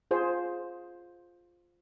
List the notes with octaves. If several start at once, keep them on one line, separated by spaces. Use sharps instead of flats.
F4 G#4 C5